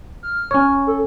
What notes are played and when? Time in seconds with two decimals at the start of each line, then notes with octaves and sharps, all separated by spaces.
0.23 F6
0.51 C#4 C#5
0.87 A4